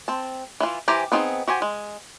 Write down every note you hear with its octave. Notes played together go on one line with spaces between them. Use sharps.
C4 A5
E3 E4 F4
E3 G4 C5 G#5 A#5
B3 C4 D#4 F4 G#4
F#4 G4 C5 G#5
G#3